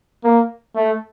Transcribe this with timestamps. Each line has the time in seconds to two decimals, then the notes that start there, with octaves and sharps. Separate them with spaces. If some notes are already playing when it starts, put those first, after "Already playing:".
0.24 A#3
0.75 A3